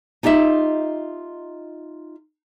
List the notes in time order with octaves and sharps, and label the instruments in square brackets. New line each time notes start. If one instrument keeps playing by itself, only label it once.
[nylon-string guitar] D#4 F4 G4 D#5 E5